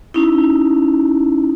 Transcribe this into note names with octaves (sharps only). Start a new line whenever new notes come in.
C#4 D#4 E4